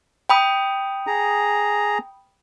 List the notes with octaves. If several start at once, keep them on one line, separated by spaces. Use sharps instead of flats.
G5 B5 D#6
G#4 A#5